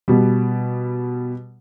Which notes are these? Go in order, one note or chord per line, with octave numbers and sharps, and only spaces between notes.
B2 G3